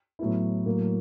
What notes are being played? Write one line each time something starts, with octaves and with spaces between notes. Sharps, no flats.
A2 F#3 B3 E4
A2 F#3 A#3